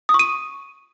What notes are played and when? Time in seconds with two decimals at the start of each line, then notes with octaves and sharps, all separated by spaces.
0.09 D#6
0.14 C#6
0.19 D#7